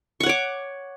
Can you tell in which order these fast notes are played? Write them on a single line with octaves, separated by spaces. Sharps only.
C#6 F#5 C#5 D6